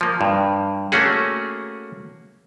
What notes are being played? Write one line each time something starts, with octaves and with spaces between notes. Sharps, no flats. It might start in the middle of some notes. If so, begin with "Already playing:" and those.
F3 A#3
G2
A3 A#3 C#4 F#4 G#4